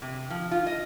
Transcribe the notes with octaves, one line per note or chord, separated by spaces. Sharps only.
C3
F3
F4
D#5